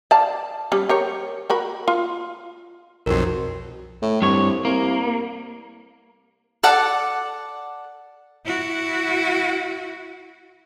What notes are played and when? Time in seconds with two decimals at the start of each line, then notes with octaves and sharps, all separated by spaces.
0.11 D5 F5 A5
0.72 G3 C#4
0.89 G4 A#4 C#5
1.50 F#4 A#4 B5
1.88 F4
3.06 B1 F2 F#4 A#4
4.02 A2
4.22 C2 G2 C#5
4.65 C2 A#3
6.63 A4 D5 F#5 A5
8.45 E4 F#4